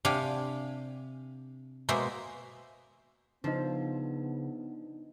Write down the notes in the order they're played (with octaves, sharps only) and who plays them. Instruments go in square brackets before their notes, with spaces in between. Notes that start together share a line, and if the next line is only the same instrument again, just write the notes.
[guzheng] C3 D4 G4 F5 G5 G#5
B2 G#3 A#3 C5 E5
[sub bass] C#3 [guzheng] F3 [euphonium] B3 [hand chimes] D4 D#4 D#5